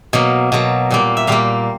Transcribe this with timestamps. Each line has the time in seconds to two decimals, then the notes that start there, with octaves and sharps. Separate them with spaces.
0.13 B2 F#3 A#3
0.52 B2 F#3 A#3
0.90 A#2 G3 A#3
1.17 E5
1.27 A#2 G3 A#3 F5